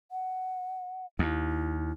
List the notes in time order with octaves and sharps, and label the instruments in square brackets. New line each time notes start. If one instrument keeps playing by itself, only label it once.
[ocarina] F#5
[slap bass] D#2 [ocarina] E4